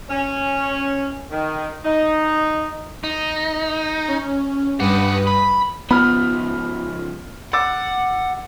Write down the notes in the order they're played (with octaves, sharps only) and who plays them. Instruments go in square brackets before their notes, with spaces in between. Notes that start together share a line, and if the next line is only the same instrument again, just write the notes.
[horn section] C#4
D#3
D#4
[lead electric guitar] D#4
[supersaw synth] C#4
[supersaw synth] G2 B4 D#6 [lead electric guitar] G4 F#5
[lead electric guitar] B5
[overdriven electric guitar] C#2 F3 [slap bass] B3 [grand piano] B5 F6
[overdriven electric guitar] F#5 [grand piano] D6 E6 A6